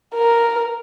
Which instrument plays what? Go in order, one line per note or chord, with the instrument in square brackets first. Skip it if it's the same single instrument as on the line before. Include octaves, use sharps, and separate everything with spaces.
[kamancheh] A#4